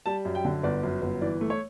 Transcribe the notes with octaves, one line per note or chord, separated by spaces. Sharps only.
G3 A5
F#2
G5
D3
G1 D5
F#2
G1
E3 D5
A3
C#5